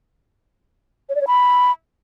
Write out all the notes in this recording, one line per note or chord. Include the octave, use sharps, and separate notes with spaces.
C#5
D5
C#5
B5